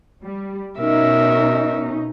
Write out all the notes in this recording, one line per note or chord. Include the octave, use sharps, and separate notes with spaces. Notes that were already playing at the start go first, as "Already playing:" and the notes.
G3
B2 C#4 D#4 A#4 E5